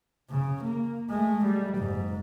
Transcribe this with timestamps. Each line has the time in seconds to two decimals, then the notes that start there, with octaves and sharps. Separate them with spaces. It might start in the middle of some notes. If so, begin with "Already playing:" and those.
0.30 C#3
0.65 A#3
1.10 G#3 A3
1.45 G3
1.77 F#1 G#2